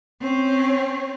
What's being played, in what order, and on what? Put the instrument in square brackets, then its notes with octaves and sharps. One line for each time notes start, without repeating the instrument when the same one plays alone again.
[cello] C4 C#4